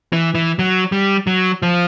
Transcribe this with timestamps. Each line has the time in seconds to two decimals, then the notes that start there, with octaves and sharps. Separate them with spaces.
0.13 E3
0.35 E3
0.59 F#3
0.92 G3
1.27 F#3
1.62 F3